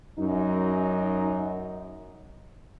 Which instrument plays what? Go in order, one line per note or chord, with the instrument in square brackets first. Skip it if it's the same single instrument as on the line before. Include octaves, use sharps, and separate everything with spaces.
[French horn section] F#2 D#4